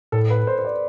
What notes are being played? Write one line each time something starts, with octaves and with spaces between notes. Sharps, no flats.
A2 A4
B4
C5
C5
D5